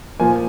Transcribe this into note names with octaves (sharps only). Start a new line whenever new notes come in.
A#2 F3 A#3 G#5